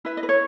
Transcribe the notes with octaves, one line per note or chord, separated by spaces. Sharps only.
E4 B4 E5
D#5
B4
C#5